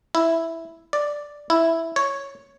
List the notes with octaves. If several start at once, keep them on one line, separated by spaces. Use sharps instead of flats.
E4
D5
E4
C#5